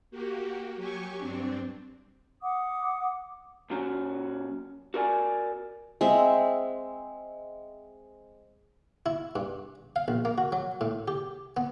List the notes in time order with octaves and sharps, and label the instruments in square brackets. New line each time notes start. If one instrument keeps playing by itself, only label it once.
[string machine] A#3 F#4 G4
F#3 G4 G#5 C#6
G2 C4 D4
[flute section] F#5 D6 D#6
[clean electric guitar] A#2 F#3 C#4 F#4
F#4 A#4 D5 G#5
[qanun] G#3 C4 E5
[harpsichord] E4
G2
F5
A#1
A#3
F#4
F#3
A2
G4
B3